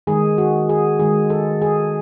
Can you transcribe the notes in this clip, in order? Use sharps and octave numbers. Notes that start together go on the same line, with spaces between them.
D#3 G#3 G#4
F#4
G#4
D#3 G#3 G#4
A4
G#4